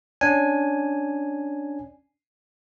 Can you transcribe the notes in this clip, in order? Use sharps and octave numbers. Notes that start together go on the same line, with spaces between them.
C#4 D4 G#5